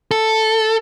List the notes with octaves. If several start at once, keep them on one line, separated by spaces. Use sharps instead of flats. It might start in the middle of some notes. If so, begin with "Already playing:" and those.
A4